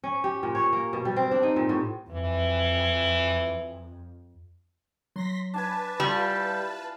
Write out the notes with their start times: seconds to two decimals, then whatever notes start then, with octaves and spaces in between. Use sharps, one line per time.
0.04 C#4
0.24 G4
0.43 A#2
0.55 C#5
0.73 A#3
0.93 B2
1.05 G3
1.16 C4
1.31 D4
1.43 D#4
1.56 A#2
1.69 A2
2.11 F2 E3
5.16 F#3 C6 A#6 B6
5.54 D4 B4 G#5 A5
6.00 G3 E4 F4 G#5